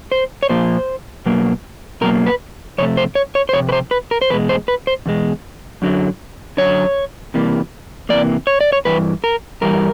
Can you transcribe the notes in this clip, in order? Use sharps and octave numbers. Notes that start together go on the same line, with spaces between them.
C5
C#5
A#2 F3 A#3 C5
B2 F#3 A#3
B2 F#3 A#3 A#4
B4
F2 C3 A3 C#5
C5
C#5
C#5
C5
F2 C3 C#5
B4
C5
B4
A#4
C5
E2 B2 G#3 B4
C5
B4
C5
E2 B2 G#3
F#2 D3 F#3
F#2 D3 F#3 C#5
C3 E3 G3 A#3
C3 E3 G3 A#3 D5
C#5
D5
C#5
G2 E3 B4
A#4
G2 E3 G3 A#4